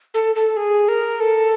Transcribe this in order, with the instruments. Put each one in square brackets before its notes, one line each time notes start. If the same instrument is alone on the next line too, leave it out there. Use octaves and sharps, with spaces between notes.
[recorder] A4
A4
G#4
A#4
A4